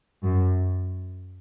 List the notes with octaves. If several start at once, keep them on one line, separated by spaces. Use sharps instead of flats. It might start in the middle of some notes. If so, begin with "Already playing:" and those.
F#2